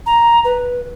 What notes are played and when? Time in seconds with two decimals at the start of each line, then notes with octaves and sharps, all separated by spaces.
0.06 A#5
0.45 B4